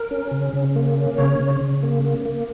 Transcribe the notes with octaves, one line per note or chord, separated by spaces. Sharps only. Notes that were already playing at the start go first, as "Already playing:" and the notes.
Already playing: A#4
C#4
C#3
C#3
A#3
C#4
C#3 C#5
C#3
C#3
A#3
A#3
A#3